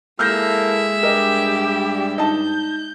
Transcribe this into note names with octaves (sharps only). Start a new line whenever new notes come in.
G#3 A#3 E4 A4 E5 F6 G6 A#6
G2 G3 G4 A#4 D#5
D#4 A5 G6